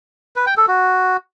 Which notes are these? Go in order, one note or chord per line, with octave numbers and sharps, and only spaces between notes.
B4
G5
A4
F#4